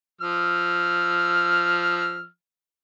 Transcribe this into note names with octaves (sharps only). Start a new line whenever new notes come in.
F3 E6 F6